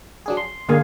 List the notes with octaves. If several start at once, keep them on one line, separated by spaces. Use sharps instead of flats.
F#3 D4 G#4
C6
D3 A#3 G#4